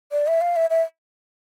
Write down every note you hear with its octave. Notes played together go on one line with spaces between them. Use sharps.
D5
E5
F5
E5
E5